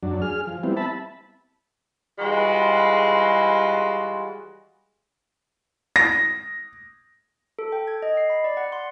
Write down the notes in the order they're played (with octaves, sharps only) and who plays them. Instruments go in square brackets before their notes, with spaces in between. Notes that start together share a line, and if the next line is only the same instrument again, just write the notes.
[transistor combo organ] F#2 F#3 D4
G#4 F6
F3
G3 B3 C4 E4
E5 A5 B5
[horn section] E3 G3 G#3 F4 F#4
[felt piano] A#6
[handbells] A4
G5
G#6
D#5
C7
B5
D5
F#5
C6